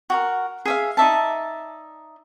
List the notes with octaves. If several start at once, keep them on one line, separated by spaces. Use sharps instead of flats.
F#4 G4 A#4
G#4 E5 F5
D#4 D5 E5 A5